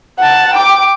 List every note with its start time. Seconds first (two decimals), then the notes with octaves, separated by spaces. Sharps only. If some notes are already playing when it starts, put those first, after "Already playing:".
0.19 F#5 A5
0.54 G5 D6